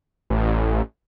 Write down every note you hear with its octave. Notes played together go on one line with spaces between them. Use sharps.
A1